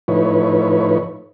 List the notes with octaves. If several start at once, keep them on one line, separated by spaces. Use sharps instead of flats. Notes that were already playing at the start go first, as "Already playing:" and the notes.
A2 F3 D#4 E4 B4 C#5